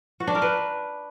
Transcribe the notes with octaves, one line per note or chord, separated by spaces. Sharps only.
F#4
D4
A#4
B4